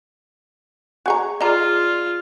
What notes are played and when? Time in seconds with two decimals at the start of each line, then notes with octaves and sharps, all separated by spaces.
1.06 F#4 G#4 G#5 A#5 C#6
1.41 F4 G#4 D5 D#5 A#5